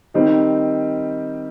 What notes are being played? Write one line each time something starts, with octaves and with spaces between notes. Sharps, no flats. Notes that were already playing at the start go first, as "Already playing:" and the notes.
D#3 G3 C4 D#4